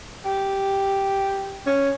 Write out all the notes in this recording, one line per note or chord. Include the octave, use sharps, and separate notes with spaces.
G4
C#4